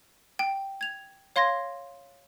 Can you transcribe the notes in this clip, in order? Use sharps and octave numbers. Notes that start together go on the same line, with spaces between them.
G5
G#6 F7
C#5 F5 C6 G#6 A#6